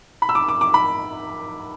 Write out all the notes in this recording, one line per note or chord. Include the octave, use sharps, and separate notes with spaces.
B5
E6
D6
D6
D6
B5